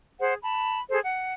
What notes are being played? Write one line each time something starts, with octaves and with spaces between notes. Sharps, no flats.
G#4 C5 F#5
A5 B5
G#4 A4 C5
F#5